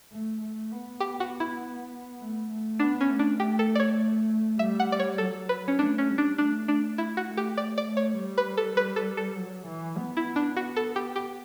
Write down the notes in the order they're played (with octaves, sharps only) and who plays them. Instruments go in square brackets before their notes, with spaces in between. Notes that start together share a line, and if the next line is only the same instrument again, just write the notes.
[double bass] A3
A3
B3
[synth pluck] G4
F#4
E4
[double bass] A3
A3
[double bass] B3 [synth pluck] D4
[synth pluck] C#4
[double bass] A3
[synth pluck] D4
[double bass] A3 [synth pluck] G4
[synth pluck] A4
D5
C#5
[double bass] G3 [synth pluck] E5
[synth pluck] F#5
D5
C#5
[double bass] F#3 [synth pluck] A4
[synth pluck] B4
C#4
[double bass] A3 [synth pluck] D4
[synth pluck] C#4
[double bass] G3
[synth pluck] D4
[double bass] A3 [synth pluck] D4
[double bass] A3 [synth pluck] D4
[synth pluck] E4
F#4
[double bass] A3
[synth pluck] G4
[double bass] A3 [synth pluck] D5
[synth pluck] D5
[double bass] A3
[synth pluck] C#5
[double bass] G3
[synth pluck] B4
A4
[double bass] G3 [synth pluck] B4
[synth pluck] A4
A4
[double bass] F#3
E3
B3
[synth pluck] E4
D4
F#4
A4
G4
G4